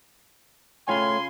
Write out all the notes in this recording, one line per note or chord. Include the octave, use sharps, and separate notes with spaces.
C#3 A3 F4 C#5 G5 G#5 B5 C6